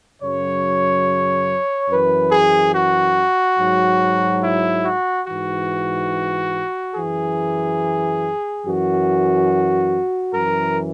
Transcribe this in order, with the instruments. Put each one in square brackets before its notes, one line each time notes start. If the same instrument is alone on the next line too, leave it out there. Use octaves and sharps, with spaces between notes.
[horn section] F#2 C#3 F#3 C#5
F#2 E3 B4
G#4
F#4
G#2 F#3
E4
F#4
G#2 E3 F#4
F#2 E3 G#4
F#2 E3 F#4
F#2 E3 A#4